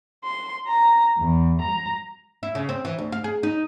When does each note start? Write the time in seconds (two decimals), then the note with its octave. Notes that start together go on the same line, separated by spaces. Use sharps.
0.24 C6
0.67 A#5
1.18 E2
1.60 A#5
2.43 E4
2.55 C#3
2.69 C4
2.85 E3
2.99 D2
3.12 F5
3.24 G#4
3.43 D#4